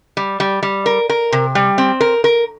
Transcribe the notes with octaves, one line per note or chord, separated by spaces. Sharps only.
G3
G3
G3
A#4
A#4
C3
G3
C4
A#4
A#4